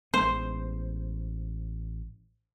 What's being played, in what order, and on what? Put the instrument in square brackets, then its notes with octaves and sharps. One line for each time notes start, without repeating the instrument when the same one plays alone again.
[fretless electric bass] A1 G#3 B3 [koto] C5